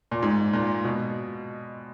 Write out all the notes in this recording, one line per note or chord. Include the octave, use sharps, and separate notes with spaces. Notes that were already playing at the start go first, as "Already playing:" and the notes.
A#2
G#2
A#2
B2